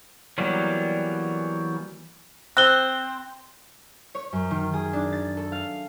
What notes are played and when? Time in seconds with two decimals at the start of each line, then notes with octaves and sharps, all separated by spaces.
0.38 E3 F#3 G3 A#3 B3
2.57 C4 F#6 G7
4.15 C#5
4.33 F#2
4.51 D#3
4.74 G#4
4.93 D4
5.13 A6
5.37 A4
5.52 F5